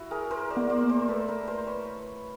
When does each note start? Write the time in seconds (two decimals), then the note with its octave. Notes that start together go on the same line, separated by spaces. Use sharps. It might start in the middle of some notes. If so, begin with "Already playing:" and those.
Already playing: E4 F#4
0.11 G#4 A#4
0.31 A#4 C5
0.50 C5 D5
0.57 B3
0.70 C5 D5
0.83 A#3
0.89 A#4 C5
1.08 A3 A4 B4
1.28 A#4 C5
1.48 A#4 C5
1.67 B4 C#5